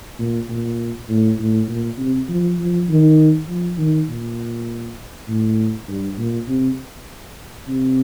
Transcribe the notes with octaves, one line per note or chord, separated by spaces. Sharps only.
A#2
A#2
A2
A2
A#2
C3
F3
F3
D#3
F3
D#3
A#2
A2
G2
A#2
C3
C3